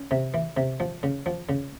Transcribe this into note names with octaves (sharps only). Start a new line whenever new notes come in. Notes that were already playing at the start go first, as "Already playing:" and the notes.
Already playing: C#4
C3
E3
C3
F3
C#3
F3
C#3